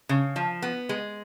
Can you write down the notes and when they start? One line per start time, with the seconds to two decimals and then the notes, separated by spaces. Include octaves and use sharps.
0.09 C#3
0.36 F3
0.62 B3
0.89 G#3